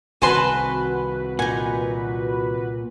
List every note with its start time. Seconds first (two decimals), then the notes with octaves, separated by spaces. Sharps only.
0.22 C2 D#3 C4 F#4 B4 G#5 A5 C6
1.39 A#2 D#4 F#5 G#5